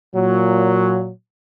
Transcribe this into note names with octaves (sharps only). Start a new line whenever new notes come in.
A#2 F#3